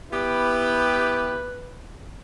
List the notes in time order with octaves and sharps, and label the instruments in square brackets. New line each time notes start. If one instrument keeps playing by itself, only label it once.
[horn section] B3 E4 G4 [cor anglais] B4